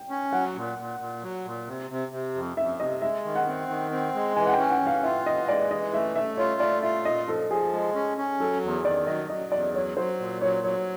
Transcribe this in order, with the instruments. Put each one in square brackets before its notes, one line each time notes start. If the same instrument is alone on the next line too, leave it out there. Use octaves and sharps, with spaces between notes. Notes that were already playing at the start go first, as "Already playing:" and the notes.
Already playing: [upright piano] G5
[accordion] C#4
[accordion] F#3 [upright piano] F#5
[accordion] A#2
A#2
A#2
F#3
A#2
C3
C3
C3
F2
[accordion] F2 [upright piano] E5
[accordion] C3 [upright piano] D#5
[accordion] G#3 [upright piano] E5
[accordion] D#3
[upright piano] F#5
[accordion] C4
D#3
C4
G#3
[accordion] E3 [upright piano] G#5
[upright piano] F#5
G5
[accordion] C#4
[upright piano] F#5
[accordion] E3
[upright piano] F5
[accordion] F4 [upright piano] E5
[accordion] E3 [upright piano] D#5
[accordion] G#3 [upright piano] D5
[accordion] E3 [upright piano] D#5
[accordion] A3 [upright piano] E5
[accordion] A3 [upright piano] E5
[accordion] F4 [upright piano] C#5
[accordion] A3 [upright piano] D5
[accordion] F4 [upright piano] E5
[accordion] A#2 [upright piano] D#5
[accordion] F3 [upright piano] A4
[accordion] F3 [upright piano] G#4
[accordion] G#3
C#4
C#4
[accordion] F#3 [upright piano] A4
[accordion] E2
[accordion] D#3 [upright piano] D5
[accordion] F#3 [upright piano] D#5
[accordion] F#3 [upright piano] D#5
[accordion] E2 [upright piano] D5
[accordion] F#3 [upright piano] C#5
[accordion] F#3 [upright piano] C5
[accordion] A#2
[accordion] F#3 [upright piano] C#5
[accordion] F#3 [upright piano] C#5